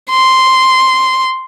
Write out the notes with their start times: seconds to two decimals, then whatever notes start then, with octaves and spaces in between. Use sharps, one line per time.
0.10 C6